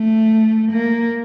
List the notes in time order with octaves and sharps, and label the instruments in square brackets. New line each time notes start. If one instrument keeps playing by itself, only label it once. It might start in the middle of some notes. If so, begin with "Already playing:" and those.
Already playing: [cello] A3
A#3